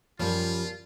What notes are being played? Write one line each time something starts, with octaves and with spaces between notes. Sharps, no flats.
F#2 F3 G3 F4